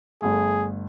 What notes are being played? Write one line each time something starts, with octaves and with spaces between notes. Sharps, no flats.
G1 A3 G#4